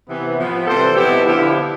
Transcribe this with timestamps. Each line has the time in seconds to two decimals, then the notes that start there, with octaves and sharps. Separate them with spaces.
0.08 C3 E3 B3
0.37 A2 F3 B3
0.67 C3 E3 G3 C4 A4 C5
0.96 B2 B3 E4 G4
1.26 D3 F3 B3 E4 G4